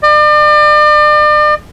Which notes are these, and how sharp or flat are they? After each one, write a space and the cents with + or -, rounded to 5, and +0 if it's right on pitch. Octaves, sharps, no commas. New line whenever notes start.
D5 +40